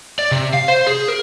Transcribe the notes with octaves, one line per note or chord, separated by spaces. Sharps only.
D5
C3
F5
C5
G#4
A#4